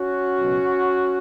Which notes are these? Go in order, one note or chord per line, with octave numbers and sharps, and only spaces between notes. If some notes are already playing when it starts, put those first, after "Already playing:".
Already playing: C#4 F#4
C#2 B2 F#3